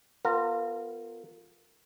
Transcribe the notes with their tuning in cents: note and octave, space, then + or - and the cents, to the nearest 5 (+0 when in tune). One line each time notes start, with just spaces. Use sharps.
B3 +0 F4 +0 A#4 -35